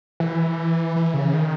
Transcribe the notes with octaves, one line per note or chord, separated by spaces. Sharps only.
E3
E3
C#3
D#3